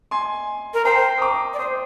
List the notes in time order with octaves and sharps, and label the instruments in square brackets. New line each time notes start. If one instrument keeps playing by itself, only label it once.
[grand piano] G#5 C6
[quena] A#4
[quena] C5 [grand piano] G5 A#5
[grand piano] D#6
A#5 D6
[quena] D5
[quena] C5 [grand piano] C6 D#6